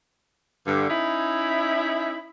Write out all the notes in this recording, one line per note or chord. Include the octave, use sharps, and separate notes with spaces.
G2 D3
C#4 D#4 E4